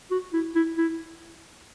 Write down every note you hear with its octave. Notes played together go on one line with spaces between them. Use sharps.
F#4
E4
E4
E4